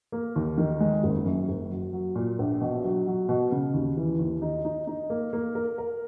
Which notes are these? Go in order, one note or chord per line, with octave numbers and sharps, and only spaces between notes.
A#3
D#2
D#3
G#3
F#1
F#2
F#1
F#3
F#3
A#2
A#1
B2
F#3
F#3
B2
C#3
D#2
E3
D#2
D#4
D#4
D#4
A#3
A#3
A#4
A#4